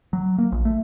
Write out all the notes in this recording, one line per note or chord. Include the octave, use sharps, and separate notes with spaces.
F#3
A#3
A#1
A3